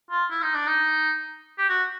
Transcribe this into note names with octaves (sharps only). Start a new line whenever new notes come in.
F4
E4
D#4
D4
D#4
G4
F#4